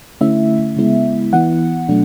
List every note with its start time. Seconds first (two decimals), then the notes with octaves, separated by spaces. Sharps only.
0.21 D3 A3 C#4 E4 E5
0.76 C#3 G#3 B3 E4
1.33 E3 B3 E4 F#5
1.89 B2 F#3 A3 D4